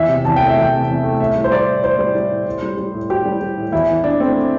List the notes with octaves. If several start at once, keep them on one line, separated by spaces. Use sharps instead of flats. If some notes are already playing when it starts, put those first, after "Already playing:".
Already playing: E2 E5
C3
E2 A5
A3 G5
E5
E2 G5
C3
E2
A3
A2 E5
G3
C5
G3 D5
A2
A2 C5
G3
G3
A2
A2
G3
G3
A2
A2 G4
G3
G3
A2
E2 E4
E3
E2 D4
A3 C4